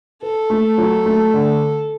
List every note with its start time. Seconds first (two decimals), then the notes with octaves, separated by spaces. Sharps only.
0.23 A4 B4
0.50 A3
0.78 F#3
1.06 A3
1.34 D3